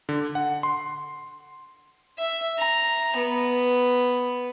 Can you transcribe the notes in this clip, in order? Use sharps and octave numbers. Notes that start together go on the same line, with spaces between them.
D3
F#5
C6
E5
A#5
B3